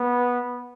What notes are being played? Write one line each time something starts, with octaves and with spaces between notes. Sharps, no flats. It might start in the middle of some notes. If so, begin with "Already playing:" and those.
Already playing: B3